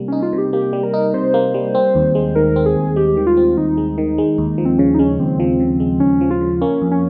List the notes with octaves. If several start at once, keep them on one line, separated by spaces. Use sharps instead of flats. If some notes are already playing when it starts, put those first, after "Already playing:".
Already playing: C3 G3 A#3
C#4 D#4
F4
C3
G4
A#3 G4
G3
A#4
D#4
C3 C5
A#3
G3
C4
D#2
G#3
D#3 A#4
C4
G#4
D#2
G#3 G4
D#3
F4
C4
D#2 D#4
G#3
D#3
G#3
D#2
F3
C4
C#3 C#4
D#4
G#3 C#4
D#2 C4
F3
C#3
G#3
D#2 C#4
F3
F4
C#3
A#3 C#4
F2
C#4